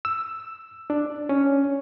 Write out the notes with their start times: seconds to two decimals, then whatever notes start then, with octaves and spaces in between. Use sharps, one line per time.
0.05 E6
0.90 D4
1.29 C#4